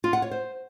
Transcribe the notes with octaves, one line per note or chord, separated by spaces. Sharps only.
F4
F#5
C#5
C5